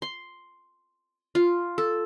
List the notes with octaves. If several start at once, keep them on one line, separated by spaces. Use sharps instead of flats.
C6
F4
A4